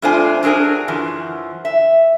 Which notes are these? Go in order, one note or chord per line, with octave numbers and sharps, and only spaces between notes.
F2 A3 D4 F4 C5 G#5
F#3 D4 G#4 A#4 G#5
F#2 E3 F3
E5